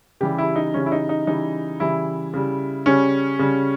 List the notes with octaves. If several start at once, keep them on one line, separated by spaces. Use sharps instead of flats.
C#3 E3 G3 G4
E4
D#4
C#3 E3 G3 C#4
E4
D#4
D#4
C#3 E3 G3 D#4
C#3 E3 G3 E4
C#3 G3
C#3 G3 C#4
C#3 G3